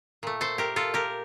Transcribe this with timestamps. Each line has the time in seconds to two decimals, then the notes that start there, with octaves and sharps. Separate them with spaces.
0.23 A#2 A3
0.41 A4 C5
0.58 G4 A#4
0.76 F4 A4
0.94 G4 A#4